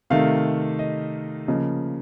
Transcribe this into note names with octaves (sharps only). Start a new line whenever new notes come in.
C3 D#3 A3 F5
D#5
C#3 F3 A#3 D#5